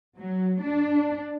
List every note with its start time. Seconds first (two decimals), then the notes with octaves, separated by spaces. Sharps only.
0.18 F#3
0.62 D4